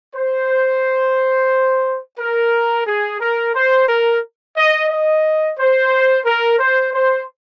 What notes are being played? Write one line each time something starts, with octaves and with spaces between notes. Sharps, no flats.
C5
A#4
G#4
A#4
C5
A#4
D#5
D#5
C5
A#4
C5
C5